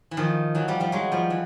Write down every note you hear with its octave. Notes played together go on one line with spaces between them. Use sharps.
E3
D#3 F3
E3 F#3
F3 G3
F3 G3
F#3 G#3
F3 G3
E3